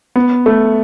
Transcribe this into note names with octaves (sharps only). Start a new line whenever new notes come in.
B3
A3